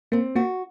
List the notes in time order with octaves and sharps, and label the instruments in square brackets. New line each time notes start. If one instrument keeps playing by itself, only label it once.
[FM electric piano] A#3 [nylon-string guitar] C4
[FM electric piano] A#3 [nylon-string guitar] F#4